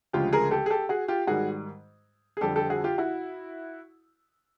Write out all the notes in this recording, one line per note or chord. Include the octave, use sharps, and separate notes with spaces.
D2 C#3 F3 G#3 F4 G4
G#4 A#4
G4 A4
G#4
G4 A4
F#4 G#4
F4 G4
G#2 D#3 G3 F#4 G#4
G#4
F2 D3 G3 G4 A4
G4 A4
F#4 G#4
F4 G4
E4 F#4